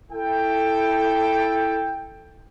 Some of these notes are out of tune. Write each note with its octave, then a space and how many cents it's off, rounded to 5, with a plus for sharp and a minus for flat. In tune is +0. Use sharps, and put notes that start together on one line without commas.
E4 +0 A4 +0 G5 +10